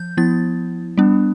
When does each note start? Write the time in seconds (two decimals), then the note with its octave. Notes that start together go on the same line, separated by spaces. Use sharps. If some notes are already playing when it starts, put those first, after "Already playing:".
Already playing: F3 G6
0.17 F3 B3 E4 A6
0.98 G3 B3 D4